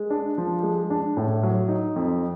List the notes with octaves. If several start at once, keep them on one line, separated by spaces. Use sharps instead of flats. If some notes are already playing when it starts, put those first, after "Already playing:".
Already playing: G#3
D4
F3
G#3
D4
A2
F#3
D#4
F2